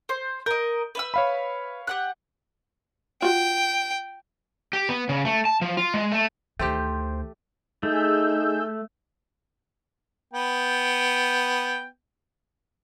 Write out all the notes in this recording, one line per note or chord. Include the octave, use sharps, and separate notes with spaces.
C5
A#4 D#5 G6
B4 E5 E6
C#5 F5 B5
G4 F#5 F#6
F4 F#4 G5
G4
B3
C#3
A3
A5
F3
F4
G#3
A3
D2 D#3 A3 G4 C5 G5
A3 D#4 G#4 E6 G6
B3 G5